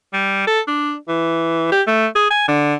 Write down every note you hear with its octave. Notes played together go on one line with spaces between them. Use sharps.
G3
A4
D4
E3
G4
A3
G#4
G#5
D3